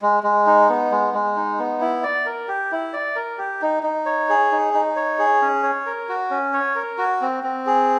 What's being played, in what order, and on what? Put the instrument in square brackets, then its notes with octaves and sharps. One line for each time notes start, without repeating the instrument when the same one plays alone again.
[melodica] G#3
G#3
D#4
B3
G#3
G#3
D#4
B3
E4
D5
A#4
G4
E4
D5
A#4
G4
D#4
D#4
C#5
G#4
D#4
D#4
C#5
G#4
C#4
C#5
A#4
F#4
C#4
C#5
A#4
F#4
C4
C4
G#4